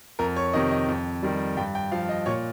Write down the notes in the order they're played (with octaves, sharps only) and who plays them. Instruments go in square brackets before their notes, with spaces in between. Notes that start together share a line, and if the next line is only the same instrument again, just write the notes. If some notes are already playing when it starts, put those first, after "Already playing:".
[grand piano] F2 A#4
C#5
C3 D#3 D#5
D#5
F2
D#3 G3
G2 G5
G5
F3 F5
D#5
A#2 C#5